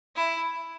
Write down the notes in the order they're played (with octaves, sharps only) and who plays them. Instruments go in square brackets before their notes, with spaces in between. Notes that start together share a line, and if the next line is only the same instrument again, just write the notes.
[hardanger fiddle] E4